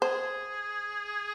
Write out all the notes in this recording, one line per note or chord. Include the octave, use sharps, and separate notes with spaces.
G#4 C5